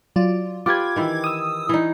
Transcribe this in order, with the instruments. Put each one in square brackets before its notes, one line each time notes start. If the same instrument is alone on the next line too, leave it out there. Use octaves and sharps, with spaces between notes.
[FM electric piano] F#3 F4 [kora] D5
[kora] F4 G4 B4 [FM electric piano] D6 G#6
[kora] D#3 E3 E4
[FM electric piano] D#6 E6
[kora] E3 D#4